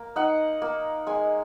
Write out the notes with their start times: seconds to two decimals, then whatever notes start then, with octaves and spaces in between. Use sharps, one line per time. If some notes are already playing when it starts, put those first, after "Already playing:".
Already playing: A#3
0.16 D#4 F#5
0.62 A#3
1.07 G#3 G#5